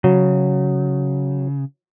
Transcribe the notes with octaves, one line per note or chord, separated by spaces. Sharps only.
C#3 F#3